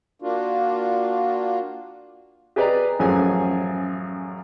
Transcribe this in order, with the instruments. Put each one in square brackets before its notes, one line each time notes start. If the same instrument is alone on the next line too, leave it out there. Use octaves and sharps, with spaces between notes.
[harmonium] A#3 D4 F4 F#4
[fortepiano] G4 G#4 B4 D5 D#5 A#5
A1 F#2 F3 G#4 G#5